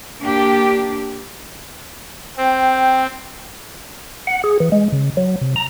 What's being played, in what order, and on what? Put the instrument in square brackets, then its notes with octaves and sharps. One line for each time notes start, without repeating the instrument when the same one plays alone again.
[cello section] A#3 D4 G4
[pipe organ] C4 [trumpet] G5
[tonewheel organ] F#5
G#4
E3
G#3
C#3
F#3
C3
A#5